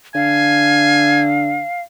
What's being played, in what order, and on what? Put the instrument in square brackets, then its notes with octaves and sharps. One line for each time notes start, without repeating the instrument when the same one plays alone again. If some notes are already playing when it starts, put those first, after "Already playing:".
[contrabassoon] D3 [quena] F5 [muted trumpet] G#5